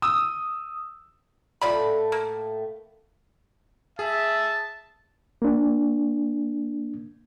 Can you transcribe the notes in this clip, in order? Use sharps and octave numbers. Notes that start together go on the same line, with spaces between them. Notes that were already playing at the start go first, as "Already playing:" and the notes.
D#6 E6
A2 A3 F4 D5 B5
A#3
G#4 E5 A5
A#3 D4